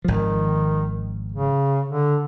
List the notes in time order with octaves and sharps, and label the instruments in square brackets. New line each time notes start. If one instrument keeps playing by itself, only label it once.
[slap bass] G#1 F3 [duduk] D#3
[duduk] C#3
D3